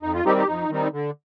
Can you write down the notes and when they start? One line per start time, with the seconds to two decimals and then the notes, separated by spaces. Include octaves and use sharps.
0.02 F2 D#4
0.14 F4
0.25 D#3 G3 C4 D#4 G4
0.37 D#4 G4
0.47 F2 D#4
0.70 D#3 G3 C4 D#4
0.93 D3